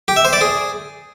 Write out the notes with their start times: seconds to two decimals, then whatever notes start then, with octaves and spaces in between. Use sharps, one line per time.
0.08 G4
0.16 E5
0.25 C5
0.33 D5
0.41 G#4